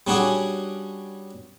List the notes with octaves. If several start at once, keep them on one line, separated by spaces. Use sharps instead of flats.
G3 C#4 D4 F#4 G#4